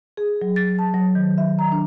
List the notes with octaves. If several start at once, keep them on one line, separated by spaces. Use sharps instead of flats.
G#4
F#3
A6
A5
F#3
D#3
E5
A#5
D4